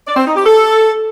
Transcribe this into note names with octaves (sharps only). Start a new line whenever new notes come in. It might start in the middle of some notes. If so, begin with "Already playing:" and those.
D5
C4
D#4
G4
A4